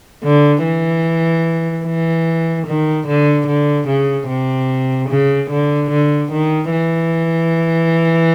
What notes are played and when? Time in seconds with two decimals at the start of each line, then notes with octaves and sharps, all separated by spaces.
0.24 D3
0.64 E3
1.85 E3
2.67 D#3
3.07 D3
3.47 D3
3.88 C#3
4.29 C3
5.09 C#3
5.50 D3
5.91 D3
6.32 D#3
6.72 E3